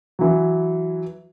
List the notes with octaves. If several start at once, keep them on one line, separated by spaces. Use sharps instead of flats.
E3 F#3